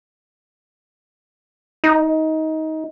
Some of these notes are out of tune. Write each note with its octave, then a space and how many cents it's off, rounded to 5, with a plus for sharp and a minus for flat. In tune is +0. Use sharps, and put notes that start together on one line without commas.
D#4 +20